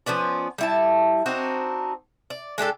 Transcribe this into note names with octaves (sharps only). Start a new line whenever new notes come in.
F3 B3 C#4 D5
G3 E4 A5
C4 D4 D#4 F#4
D5
G#3 D4 G4 A4